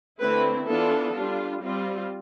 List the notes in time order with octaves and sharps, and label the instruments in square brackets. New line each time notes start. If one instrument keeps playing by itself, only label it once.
[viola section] D3 A3 C4 E4 B4
E3 B3 D4 F4 A4
G3 D4 F4
G3 C4 F4